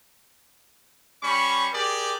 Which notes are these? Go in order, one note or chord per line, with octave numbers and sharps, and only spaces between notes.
G3 C#4 B5 C#6
G4 G#4 A#4 D5